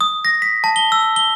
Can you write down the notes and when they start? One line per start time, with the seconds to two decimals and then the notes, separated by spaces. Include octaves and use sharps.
0.01 D#6
0.25 A#6
0.42 B6
0.64 A5
0.76 G7
0.92 E6
1.16 G7